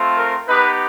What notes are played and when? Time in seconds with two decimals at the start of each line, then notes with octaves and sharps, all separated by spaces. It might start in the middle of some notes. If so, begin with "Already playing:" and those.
Already playing: A3 C4 F4
0.18 A#4
0.48 B3 D#4 G4 B4